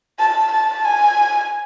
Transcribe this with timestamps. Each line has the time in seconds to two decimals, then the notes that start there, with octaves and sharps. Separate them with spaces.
0.19 A5
0.52 A5
0.85 G#5